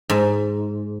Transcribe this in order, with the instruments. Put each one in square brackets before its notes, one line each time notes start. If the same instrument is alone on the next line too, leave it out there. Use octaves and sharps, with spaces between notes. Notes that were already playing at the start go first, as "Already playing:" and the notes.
[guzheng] G#2